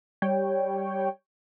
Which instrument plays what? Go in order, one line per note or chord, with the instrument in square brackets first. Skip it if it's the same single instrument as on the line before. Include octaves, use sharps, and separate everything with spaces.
[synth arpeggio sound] G3 C#5 G5